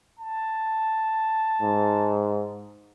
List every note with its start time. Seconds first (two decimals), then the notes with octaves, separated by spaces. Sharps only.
0.19 A5
1.62 G#2